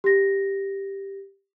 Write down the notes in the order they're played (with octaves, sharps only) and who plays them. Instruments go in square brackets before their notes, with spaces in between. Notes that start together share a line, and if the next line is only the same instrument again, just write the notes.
[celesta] G4 A#6